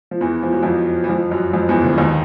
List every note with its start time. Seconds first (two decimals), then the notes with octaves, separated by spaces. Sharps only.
0.11 F3
0.21 E2 E3
0.43 F3
0.53 F#3
0.63 F2 F3
1.04 E3
1.09 F2 F3
1.31 F#2 F#3
1.53 F2 F3
1.69 E2 E3
1.83 D2 D3
1.98 D#2 D#3